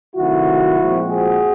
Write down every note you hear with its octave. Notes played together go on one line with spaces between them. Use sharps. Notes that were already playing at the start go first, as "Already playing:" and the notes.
C3 D#3 F#3 A3 C4 E4 F#4
A#2 F3 G#3 C4
F#4 G#4